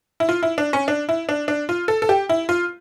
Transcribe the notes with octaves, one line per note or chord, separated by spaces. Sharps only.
E4
F4
E4
D4
C#4
D4
E4
D4
D4
F4
A4
A4
G4
E4
F4